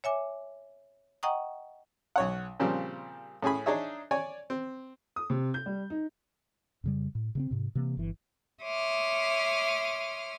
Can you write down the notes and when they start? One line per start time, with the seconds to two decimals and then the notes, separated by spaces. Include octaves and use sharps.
0.04 C#5 E5 G#5 D6
1.23 D#5 F#5 G5 A#5 C#6 D#6
2.16 B1 C#5 F#5
2.60 A#2 C#3 F3 G3 C4
3.43 A2 C#4 G#4 G#5 B5
3.66 D4 D#4 G#4 C#5 E5
4.11 C#5 D5 G#5
4.50 C4
5.16 D#6
5.30 C3
5.54 G6
5.66 G3
5.90 D#4
6.84 F2 C#3 G3
7.15 A2
7.35 C#3 A#3 C4
7.51 G#2 C3
7.75 C3 E3 A#3
7.97 G1 E3
8.63 C#5 E5 C6 D6 D#6 F6